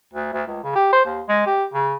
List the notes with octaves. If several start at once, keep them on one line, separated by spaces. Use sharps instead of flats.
D2
D2
C#2
C#3
G4
C5
D#2
G#3
G4
C#3